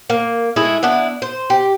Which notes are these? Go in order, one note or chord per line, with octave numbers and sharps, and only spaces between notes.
A#3
G#3 A3 E4 G#4
B3 D4 E4
C5
G4